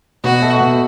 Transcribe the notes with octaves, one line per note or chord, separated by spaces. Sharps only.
B2 F#4
A3
B2